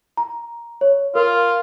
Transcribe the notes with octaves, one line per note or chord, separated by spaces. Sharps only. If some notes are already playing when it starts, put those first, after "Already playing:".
A#5
C#5
F4 A#4